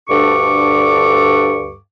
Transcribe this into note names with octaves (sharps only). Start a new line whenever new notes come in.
D2 G2 D4 A4 C#6 D6